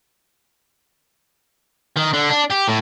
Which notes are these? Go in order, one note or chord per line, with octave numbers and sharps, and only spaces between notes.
D#3
D3
D4
G4
A2